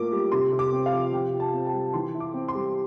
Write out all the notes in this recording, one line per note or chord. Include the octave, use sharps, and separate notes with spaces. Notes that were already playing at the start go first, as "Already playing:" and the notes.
Already playing: A2 A#3 F4 D6
G3
C3 C6
C3
D6
C4
F5
F3
C3 G5
F4
A5
C4
A5
G3
E3 C6
E4
D6
C4
C6
G3